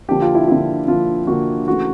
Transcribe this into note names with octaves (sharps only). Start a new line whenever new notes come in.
D3 F3 A#3 G4
F4
E4
D3 F3 A#3 E4
D3 F3 A#3 F4
D3 F3 A#3 F#4
C#3 E3 A3 F#4